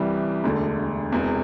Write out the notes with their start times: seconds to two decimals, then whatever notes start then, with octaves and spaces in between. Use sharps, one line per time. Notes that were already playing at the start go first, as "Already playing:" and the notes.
Already playing: C2 C3 E3 G3
0.44 E1 D2 D3 A3
1.11 E1 E2 C3